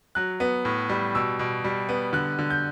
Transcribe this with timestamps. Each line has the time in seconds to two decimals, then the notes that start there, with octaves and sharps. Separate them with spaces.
0.15 F#3 F#6
0.40 B3
0.65 A2
0.89 G3
1.15 B2 E6
1.39 B2
1.64 G3
1.89 B3
2.13 D3 F#6
2.39 D3
2.50 G6